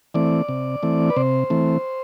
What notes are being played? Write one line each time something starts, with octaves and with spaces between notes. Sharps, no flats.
E3 A3 C4 D5
C3
E3 A3 C4
B4
C3 C5
E3 A3 C4